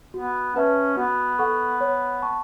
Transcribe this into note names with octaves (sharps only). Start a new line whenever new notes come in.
B3 F#4
C#4 B4 E5 A5
B3 F#4
A4 F#5 C#6
C#5
A5 C#6